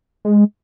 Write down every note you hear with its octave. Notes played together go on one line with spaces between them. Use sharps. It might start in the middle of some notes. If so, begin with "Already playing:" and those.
G#3